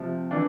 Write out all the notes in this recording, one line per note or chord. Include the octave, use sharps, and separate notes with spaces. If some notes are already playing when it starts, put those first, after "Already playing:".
Already playing: C3 F3 A3
E3 A3 D4